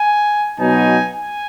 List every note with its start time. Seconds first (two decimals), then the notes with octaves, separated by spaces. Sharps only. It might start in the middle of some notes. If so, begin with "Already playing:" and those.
Already playing: G#5
0.59 B2 F#3 B3 D#4 G#5
1.14 G#5